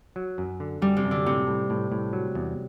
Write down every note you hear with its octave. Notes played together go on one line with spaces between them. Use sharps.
F#3
F#2
D3
F#2 G3
C3
F#2
D3
A2 C3
A2
A2
A2
F#3
E2